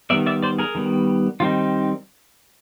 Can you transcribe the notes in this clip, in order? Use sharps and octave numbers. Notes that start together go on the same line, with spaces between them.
D#3 G3 B3 D5 E5
D5 E5
C5 D5
G#4 A#4
D#3 G3 B3
D#3 G3 C4 D#4 F4